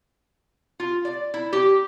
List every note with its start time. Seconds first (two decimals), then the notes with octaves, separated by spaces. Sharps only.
0.80 F4
1.05 D5
1.34 E4
1.53 G4